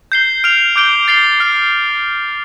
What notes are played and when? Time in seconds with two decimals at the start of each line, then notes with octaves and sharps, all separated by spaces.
0.12 G6 C7 G7
0.44 F6 D7 F7
0.76 D6 G6 D7 G7
1.08 A6 C7 G7
1.40 F6 C7 G7